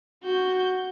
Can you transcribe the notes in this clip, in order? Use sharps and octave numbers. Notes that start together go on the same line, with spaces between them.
F#4 G6